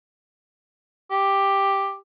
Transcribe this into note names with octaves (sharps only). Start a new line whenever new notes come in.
G4